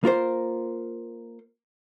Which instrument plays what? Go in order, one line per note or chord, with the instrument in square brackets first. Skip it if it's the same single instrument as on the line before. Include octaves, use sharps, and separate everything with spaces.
[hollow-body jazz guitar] A#3 F4 A#4 C5